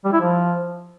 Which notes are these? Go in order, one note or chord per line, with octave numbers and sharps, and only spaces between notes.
G3
E4
F3